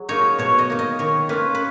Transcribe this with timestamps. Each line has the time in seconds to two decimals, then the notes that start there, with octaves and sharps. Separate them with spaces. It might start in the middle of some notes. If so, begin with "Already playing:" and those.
Already playing: F#3 G#4
0.09 A#3 D#4 C#5
0.38 B2 C#5
0.59 D#5
0.70 A#3 D#4
0.79 D#5
0.99 D#3 C#5
1.29 A#3 C#4 F4 B4
1.55 B4